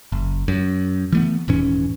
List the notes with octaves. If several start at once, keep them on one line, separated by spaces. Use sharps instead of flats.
F#1
F#2
E3 A3 B3
D#1 G#2 E3 C#4